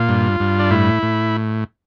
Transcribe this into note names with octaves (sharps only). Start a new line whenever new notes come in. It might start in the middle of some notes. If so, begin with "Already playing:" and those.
Already playing: A#2 F4
G2
G2
D4
A2 E4
A2